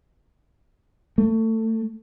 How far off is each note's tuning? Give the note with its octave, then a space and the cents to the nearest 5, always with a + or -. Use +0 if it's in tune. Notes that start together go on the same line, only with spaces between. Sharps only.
A3 +25